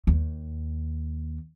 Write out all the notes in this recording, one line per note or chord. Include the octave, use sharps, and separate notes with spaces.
D#2